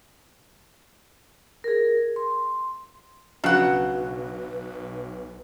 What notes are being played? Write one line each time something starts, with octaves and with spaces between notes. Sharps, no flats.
G#4 A#4
C6
B1 C#3 F#3 D4 B4 F#5